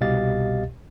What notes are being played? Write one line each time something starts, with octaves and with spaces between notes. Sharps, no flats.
C2 B2 G4 D#5 F5 A6